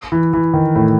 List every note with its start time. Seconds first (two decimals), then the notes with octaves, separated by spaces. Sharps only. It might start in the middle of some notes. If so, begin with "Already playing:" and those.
0.12 E3
0.33 E3
0.54 D#3
0.76 A2